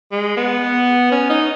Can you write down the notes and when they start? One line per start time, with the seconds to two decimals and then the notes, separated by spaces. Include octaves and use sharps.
0.12 G#3
0.37 B3
1.12 C#4
1.30 D#4